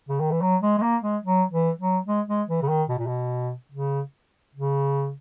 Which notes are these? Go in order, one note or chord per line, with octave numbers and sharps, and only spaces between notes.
C#3
D#3
E3
F#3
G#3
G#3
A#3
G#3
F#3
E3
F#3
G#3
G#3
E3
C#3
D#3
B2
A#2
B2
C#3
C#3